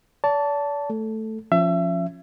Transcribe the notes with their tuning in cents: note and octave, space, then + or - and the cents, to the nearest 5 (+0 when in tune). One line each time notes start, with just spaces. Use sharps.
D5 -45 A5 +0
A3 +0 A4 +0
F3 +0 C#4 -10 E5 +30